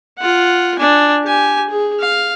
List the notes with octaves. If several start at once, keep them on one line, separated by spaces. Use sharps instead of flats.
F4 F#5
D4 G#5
G4 G#5
G#4
F5